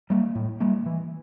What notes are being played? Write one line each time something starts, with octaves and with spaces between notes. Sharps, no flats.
G3 A#3
A2
G3 A#3
E3